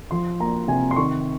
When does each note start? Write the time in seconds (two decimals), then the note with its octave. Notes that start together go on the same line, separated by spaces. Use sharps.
0.11 F3 C6
0.40 A#3 A#5
0.68 C3 G#5
0.91 C6
0.96 D#3 C#6